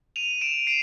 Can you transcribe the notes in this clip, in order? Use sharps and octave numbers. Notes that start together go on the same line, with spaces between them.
D#7 F7
D7 E7
C7 D7